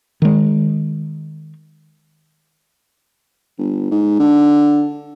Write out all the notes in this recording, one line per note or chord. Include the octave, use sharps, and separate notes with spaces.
D#3 G#3
G1
G#2
D3